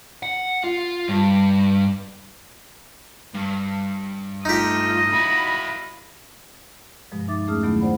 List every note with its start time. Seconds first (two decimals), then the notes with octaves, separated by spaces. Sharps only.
0.23 F#5
0.64 F4
1.08 G2
3.34 G2
4.45 A3 D#4 F4 G4 D#5
5.12 E4 F#4 B5
7.12 G2 B2 F3 G#3
7.28 D#4 E5 D6 A6
7.47 E2 A3 C#4 G#4 D#6 F6
7.62 C3 D#3 F#3 A3 B3 E4
7.81 C5 D5 F#5 B5